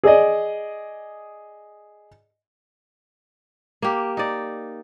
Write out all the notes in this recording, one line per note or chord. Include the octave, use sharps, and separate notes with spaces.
G#4 D5 D#5
A#3 G4
D#4 D5